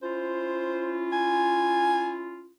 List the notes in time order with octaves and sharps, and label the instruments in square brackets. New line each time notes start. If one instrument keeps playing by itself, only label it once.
[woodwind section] C#4 E4 F4 [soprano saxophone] C5
[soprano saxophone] G#5